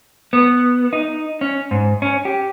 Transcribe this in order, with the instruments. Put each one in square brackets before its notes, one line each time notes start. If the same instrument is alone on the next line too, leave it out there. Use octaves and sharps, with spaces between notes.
[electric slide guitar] B3
D#4
C#4
G#2
C#4
G4